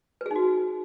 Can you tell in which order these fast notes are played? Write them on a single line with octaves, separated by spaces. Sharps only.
B4 G#4 D#4 F#4